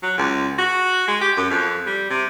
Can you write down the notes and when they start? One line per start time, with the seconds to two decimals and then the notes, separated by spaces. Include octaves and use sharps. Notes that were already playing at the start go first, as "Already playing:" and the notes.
0.03 F#3
0.18 C#2
0.58 F#4
1.08 G#3
1.21 G4
1.37 F#2
1.50 F2
1.86 G3
2.10 C3